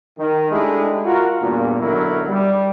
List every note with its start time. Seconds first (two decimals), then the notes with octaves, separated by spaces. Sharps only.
0.19 D#3
0.51 G#3 A3 D4 E4 G4 G#4
1.05 F4 F#4 A#4
1.41 E2 G2 A#2
1.79 B1 D3 F#3 E4 A#4
2.28 G3